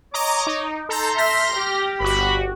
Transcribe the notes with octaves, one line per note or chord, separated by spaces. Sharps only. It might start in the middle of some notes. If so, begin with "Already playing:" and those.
C#5 D#5 A#5 D6
D#4
A4 A#5 C6 G6
E5 F6 G6 A#6
G4
G1 F#4 B5